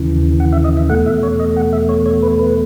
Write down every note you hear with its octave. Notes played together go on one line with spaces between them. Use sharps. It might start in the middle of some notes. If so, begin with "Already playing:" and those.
Already playing: D#2 C#3 E3
F#5
E5
D#5
E5
E2 B2 A3 F#5
E5
C#5
D#5
F#5
E5
C#5
C#5
B4
B4